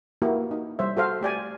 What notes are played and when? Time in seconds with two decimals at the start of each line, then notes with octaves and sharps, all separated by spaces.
0.22 A#3 E4 F#4 G4
0.51 D#4
0.79 G3 C5 E5
0.97 F#4 A4 C5 F5
1.21 A3 G4 D5 G#5